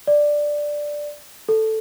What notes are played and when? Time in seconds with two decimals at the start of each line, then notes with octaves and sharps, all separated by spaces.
0.07 D5
1.49 A4